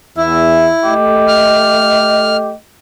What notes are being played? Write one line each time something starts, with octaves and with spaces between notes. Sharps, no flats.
E2 E4 E5
A3 G4 D#5
F6